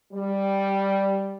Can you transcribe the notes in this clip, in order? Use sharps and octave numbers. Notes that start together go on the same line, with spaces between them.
G3